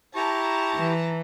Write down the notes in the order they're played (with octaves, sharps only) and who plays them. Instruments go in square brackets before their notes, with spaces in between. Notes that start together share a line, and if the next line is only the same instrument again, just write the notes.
[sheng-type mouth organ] E4 G4 [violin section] A5 A#5 [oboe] C#6
[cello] E3